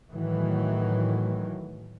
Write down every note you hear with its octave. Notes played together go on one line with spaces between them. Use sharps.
A2 D#3 E3 F#3